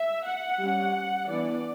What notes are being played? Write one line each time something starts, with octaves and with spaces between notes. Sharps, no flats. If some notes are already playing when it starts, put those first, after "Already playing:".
Already playing: E5
F#5
G3 C#4
E3 B3 D4 D5